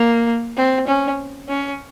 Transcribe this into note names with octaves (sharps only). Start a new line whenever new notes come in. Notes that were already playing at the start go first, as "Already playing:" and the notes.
Already playing: A#3
C4
C#4
C#4